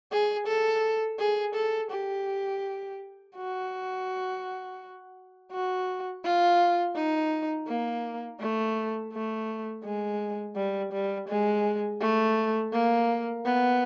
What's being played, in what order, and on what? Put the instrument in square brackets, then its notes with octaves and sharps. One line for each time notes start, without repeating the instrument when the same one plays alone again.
[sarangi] G#4
A4
G#4
A4
G4
F#4
F#4
F4
D#4
A#3
A3
A3
G#3
G3
G3
G#3
A3
A#3
B3